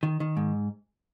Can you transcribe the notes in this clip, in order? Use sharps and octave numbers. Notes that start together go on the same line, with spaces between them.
D#3
D#3
G#2